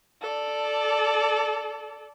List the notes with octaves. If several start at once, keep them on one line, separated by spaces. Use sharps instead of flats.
A4 D5